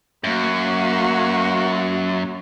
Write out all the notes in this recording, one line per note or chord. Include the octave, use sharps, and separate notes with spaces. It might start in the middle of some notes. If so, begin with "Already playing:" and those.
F#2 A#3 F#4